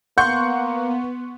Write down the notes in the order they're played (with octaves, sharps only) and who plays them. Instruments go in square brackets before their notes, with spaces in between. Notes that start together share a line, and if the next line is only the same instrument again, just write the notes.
[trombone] A#3 [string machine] B3 [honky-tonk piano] F#5 C6 C#6 [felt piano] G6